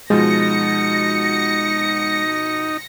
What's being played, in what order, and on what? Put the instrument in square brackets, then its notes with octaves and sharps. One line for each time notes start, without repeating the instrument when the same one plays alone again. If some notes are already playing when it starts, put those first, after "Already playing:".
[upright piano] B2 F3 [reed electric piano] G#3 [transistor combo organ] D#4 [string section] A#6 C#7